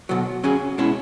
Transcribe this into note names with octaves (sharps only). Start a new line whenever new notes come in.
B1 B2 F#3
F#2 C#3 F#3 C#4 G#4
B2 G#3 C#4 E4